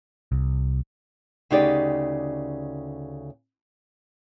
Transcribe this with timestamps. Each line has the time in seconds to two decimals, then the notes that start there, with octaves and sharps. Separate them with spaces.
0.32 C2
1.51 D2 C#3 D#4 G4 D5